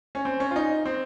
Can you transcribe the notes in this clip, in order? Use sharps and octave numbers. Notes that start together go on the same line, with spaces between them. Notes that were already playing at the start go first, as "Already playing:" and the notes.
C#4
C4
C#4
F4
D#4
C4